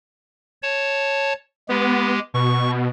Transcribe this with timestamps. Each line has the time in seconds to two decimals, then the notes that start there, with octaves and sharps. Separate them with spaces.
0.62 C#5 A5
1.69 G#3 B3 G4
2.34 B2 C#6